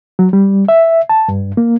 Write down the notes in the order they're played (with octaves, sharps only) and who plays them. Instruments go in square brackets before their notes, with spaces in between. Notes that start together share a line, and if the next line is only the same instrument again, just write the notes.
[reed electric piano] F#3
G3
E5
A5
G2
A#3